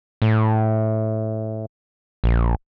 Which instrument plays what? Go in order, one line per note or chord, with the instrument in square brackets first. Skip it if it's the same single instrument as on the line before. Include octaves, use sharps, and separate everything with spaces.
[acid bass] A2
A#1